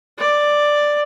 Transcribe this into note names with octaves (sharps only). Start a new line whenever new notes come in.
D5